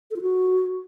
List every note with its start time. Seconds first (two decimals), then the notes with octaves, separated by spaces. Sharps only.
0.11 A4
0.16 F4
0.22 F#4